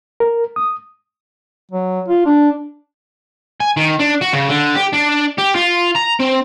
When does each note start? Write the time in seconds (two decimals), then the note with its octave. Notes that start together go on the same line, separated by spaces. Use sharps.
0.20 A#4
0.56 D#6
1.72 F#3
2.08 F4
2.26 D4
3.60 G#5
3.77 D#3
3.99 D4
4.21 F#4
4.33 C#3
4.49 D3
4.75 G4
4.93 D4
5.38 G4
5.55 F4
5.95 A#5
6.20 C4